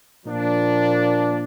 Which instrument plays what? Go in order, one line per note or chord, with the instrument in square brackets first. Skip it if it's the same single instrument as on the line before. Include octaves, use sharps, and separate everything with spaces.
[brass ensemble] A#2 F3 A#3 D4